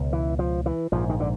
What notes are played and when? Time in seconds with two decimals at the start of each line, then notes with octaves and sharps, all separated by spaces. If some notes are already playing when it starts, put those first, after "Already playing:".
Already playing: C#2 B2
0.13 E3
0.39 F3
0.66 E3
0.92 A#1 G#2 F3
1.10 D#3
1.20 D3